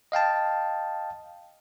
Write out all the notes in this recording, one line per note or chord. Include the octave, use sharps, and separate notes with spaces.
D#5 F5 G5 A5